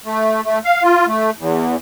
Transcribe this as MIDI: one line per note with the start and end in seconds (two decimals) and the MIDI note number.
0.05 0.41 57
0.44 0.59 57
0.65 0.83 77
0.83 1.06 65
1.07 1.30 57
1.38 1.76 40